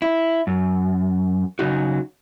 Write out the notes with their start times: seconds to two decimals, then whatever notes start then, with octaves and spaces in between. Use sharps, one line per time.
0.02 E4
0.47 F#2
1.59 C#3 F3 F#3 D#4 F#4